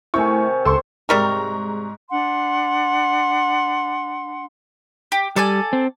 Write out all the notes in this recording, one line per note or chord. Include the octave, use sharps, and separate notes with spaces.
C3 D#3 A3 E4 G#5 C#6
C#2 A4 C5 C6 C#6 E6
G#2 C3 G3 A#4 A#5 C#6
D4 F#5 C6
G4
G3 A4 D5 G#5
C4